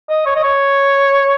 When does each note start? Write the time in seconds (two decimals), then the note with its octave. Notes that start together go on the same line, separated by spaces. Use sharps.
0.10 D#5
0.26 C#5
0.36 D#5
0.43 C#5